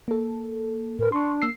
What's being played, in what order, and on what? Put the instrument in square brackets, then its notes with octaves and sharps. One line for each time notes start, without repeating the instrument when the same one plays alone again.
[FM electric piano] A#3 A4
[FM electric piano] A2 B4 [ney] A#4
[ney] D4 [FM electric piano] C6 C#6
[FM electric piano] A#3 E6 C7